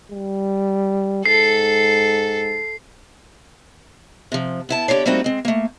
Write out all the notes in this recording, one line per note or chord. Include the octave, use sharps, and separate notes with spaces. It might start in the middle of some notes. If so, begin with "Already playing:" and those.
G3
G#2 A4 C7
C3 F3
B3 E4 A5
D3 F4 G4 C#5 D5
G3 A3 A#3 C4 D#4 F#4
G#3 C4
A3 A#3